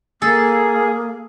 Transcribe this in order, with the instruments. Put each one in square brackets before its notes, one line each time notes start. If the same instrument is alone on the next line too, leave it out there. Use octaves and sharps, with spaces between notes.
[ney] A#3 [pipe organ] G#4 [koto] A4